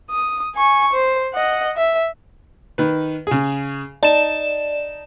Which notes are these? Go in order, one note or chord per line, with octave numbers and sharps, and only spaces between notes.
D#6
G#5 C#6
C5
D#5 F#5
E5
D#3 B4
C#3 G#4
D#4 D5 A5 E7